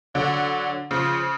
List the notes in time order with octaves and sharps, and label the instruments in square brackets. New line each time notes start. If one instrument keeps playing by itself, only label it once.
[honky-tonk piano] D3 [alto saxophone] F#3
[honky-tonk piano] C#3 [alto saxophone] F3